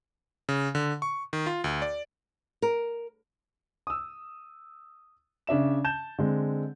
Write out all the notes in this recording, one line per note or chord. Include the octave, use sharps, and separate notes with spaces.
C#3
D3
C#6
D#3
F4
D2
D5
A#4
D#6 E6
C#3 D4 E5 E7
A5 G6 E7
D3 G#3 C4